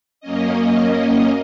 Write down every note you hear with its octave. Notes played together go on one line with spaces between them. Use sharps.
F#2 A#3 C#4 D#5